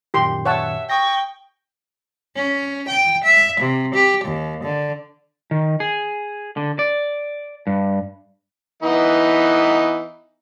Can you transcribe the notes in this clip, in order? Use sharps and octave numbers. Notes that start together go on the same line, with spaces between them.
F#2 A#2 D#3 G4 C6
C#5 E5 F#5 A5
G5 C#6 D#6 A#6
C#4
G5
E5
C3
G4
D#2
D3
D#3
G#4
D3
D5
G2
E3 B3 D#4